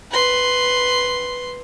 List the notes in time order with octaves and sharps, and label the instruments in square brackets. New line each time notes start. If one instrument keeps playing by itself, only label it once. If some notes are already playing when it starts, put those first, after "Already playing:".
[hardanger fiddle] B4 C6